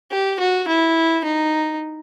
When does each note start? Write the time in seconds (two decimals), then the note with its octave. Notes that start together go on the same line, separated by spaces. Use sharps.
0.11 G4
0.40 F#4
0.68 E4
1.25 D#4